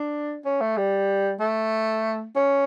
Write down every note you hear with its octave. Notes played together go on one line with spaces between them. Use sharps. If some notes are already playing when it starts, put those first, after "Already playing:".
Already playing: D4
C#4
A3
G3
A3
C#4